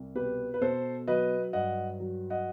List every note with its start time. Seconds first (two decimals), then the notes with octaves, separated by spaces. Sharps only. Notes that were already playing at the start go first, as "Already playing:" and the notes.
Already playing: C2
0.15 B2 G4 B4
0.54 B4
0.61 B2 A4 C5
1.08 F#3 B4 D#5
1.53 G2 D#5 F#5
2.00 F#3
2.30 D#5 F#5